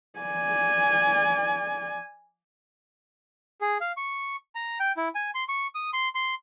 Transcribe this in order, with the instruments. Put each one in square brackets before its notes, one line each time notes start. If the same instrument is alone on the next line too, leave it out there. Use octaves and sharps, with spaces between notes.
[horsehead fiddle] D5 G#5
[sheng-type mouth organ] G#4
F5
C#6
A#5
G5
E4
G#5
C6
C#6
D#6
C6
C6